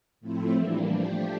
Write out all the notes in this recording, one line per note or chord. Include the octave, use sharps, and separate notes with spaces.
A2 F3 A3 C4 E4
E3 G3 A#3 D4
F3 A3 D4 G4